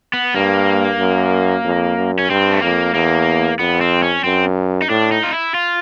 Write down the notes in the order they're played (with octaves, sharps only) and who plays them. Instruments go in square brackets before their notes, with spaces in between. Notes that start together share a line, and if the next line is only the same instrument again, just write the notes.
[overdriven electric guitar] B3
[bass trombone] G2 [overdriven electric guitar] A#3
[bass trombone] F#2
F2
F#2
[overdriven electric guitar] C#4
[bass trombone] G2 [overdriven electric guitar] C4
[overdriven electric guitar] A3
[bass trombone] F2 [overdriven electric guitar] A#3
[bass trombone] E2 [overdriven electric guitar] A#3
[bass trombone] F2 [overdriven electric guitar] B3
[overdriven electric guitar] C4
C#4
[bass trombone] F#2 [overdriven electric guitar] C4
[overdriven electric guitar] D#4
[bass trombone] A2 [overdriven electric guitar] D4
[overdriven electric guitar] D#4
F4
E4
F4